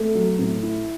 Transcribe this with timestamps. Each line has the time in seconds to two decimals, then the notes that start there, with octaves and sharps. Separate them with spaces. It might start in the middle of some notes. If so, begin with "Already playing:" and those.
Already playing: A3
0.15 F#3
0.39 A2
0.63 E4